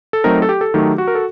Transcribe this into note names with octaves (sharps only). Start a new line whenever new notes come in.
A4
F#3 A3 C4 D#4 A#4
A4
G4
A4
D#3 F#3 A3 D#4 G4
F#4
A#4
A4